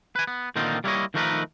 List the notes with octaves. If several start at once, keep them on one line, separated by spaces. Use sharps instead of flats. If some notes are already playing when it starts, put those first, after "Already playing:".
B4 G#5
B3
A#2 D3 D#3 C4 D#4 F4
G3 A#3 E4 A4 C#5 D#5
D#3 F3 A3 D#4 A#4 B4